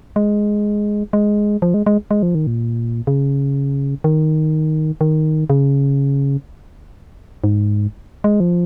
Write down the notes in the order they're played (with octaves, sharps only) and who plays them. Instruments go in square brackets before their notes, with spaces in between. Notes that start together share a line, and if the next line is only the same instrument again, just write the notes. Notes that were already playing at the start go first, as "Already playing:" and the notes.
[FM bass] G#3
G#3
F3
G#3
G#3
G#3
F3
D#3
A#2
C#3
D#3
D#3
C#3
G#2
G#3
F3